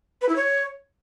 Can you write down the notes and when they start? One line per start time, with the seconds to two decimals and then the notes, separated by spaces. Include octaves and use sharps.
0.22 B4
0.29 E4
0.36 C#5